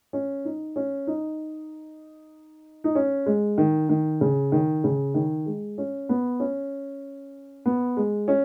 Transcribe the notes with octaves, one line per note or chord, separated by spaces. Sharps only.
C#4
D#4
C#4
D#4
D#4
C#4
G#3
D#3
D#3
C#3
D#3
C#3
D#3
G#3
C#4
B3
C#4
B3
G#3
C#4